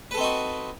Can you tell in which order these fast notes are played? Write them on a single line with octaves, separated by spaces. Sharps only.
B4 A4 C4 D#4 F#4